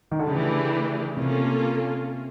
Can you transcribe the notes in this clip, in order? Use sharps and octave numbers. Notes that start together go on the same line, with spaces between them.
D#3
D3
C#3 E3 A3 D4 G4
C3 A#3 C#4 F4 A4